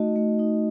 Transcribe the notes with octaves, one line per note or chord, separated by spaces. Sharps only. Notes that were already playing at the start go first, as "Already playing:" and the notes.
Already playing: A3 D#4 F#4 D#5
A3
D#4